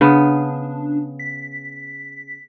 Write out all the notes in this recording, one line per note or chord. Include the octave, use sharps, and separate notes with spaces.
C#3 B3 D4
B6